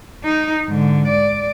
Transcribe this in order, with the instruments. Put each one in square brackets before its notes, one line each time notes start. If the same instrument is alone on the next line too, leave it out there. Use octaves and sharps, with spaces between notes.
[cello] D#4
G#2 D3
D5